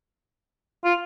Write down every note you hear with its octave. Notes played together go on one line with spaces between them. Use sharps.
F4